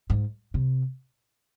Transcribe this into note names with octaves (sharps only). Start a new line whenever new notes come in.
G#2
C3